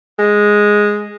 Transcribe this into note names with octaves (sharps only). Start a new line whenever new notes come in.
G#3